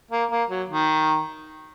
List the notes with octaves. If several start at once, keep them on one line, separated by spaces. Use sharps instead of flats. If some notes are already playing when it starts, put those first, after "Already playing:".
A#3
A#3
F#3
D#3